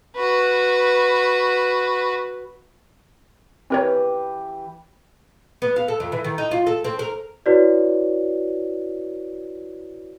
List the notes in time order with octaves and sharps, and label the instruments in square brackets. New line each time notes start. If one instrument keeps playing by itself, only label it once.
[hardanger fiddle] F#4 B4
[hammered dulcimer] E3 G4 B4 [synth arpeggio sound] C4 A#4 C#5
[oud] B3
F5
A4
F2
E3
D#3
D#4
F4
A4
C4
A#4
[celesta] E4 F#4 B4 C#5 D5